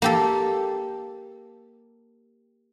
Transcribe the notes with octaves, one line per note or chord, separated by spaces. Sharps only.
A#3 G4 A4